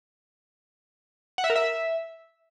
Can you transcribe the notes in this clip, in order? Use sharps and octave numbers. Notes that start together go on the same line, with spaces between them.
F#5
E5
A#4
E5